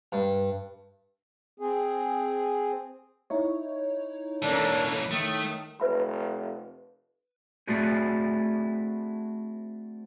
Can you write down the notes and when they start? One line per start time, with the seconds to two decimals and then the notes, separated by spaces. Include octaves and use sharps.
0.12 G2
1.60 C4 G#4
3.30 D#4 E4 C#5
4.42 E3 A#3 C#4 D4 A4 A#4
5.11 D#3 A3 D#6
5.80 F1 B4 E5 B5
7.67 A3 C4 D4 E4 F#4 G#4